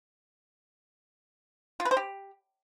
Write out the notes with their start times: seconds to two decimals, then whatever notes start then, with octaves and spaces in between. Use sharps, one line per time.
1.80 F4
1.85 B4
1.91 C5
1.97 G4